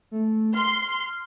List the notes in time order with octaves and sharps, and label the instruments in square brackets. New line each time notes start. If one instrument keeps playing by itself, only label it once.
[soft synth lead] A3
[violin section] C6 [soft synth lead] F6